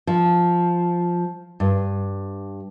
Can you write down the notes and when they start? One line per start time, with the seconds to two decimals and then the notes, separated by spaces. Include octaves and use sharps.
0.07 F3
1.60 G2